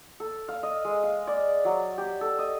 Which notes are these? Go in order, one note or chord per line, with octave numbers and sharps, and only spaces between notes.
A4
F5
D#5
G#3
F5
D5
F#3
G4
A4
D#5